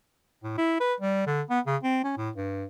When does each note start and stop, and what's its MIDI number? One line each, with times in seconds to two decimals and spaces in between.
0.43 0.53 45
0.58 0.75 64
0.80 0.94 71
1.00 1.23 55
1.27 1.42 50
1.50 1.60 59
1.66 1.77 49
1.83 1.99 60
2.04 2.14 61
2.17 2.30 45
2.36 2.64 43